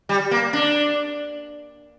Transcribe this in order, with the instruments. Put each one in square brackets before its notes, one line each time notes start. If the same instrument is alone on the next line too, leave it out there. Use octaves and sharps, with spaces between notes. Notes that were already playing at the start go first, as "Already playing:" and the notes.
[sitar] G3
A#3
D4